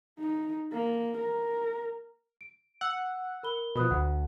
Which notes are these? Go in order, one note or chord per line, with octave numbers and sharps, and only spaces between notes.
D#4
A#3
A#4
D7
F#5 E6
A#4 B5 G7
B2 F3 B5 D#6 F#6
D2 F#5